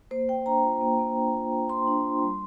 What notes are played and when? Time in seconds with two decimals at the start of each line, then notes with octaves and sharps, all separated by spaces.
0.11 A#3 C5
0.29 A#3 G5
0.46 D4 A#5
0.64 F4
0.81 A#3
0.99 A#3
1.16 D4
1.34 F4
1.51 A#3
1.70 A#3 C6
1.87 D4
2.05 F4
2.22 G3